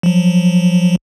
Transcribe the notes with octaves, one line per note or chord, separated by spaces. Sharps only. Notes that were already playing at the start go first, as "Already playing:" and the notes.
F3 F#3